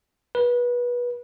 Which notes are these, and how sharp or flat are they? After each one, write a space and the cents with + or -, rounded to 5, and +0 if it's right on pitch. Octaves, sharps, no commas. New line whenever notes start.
B4 -25